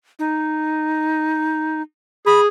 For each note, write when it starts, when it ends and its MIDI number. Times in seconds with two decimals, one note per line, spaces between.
0.19 1.82 63
2.26 2.48 68
2.26 2.41 83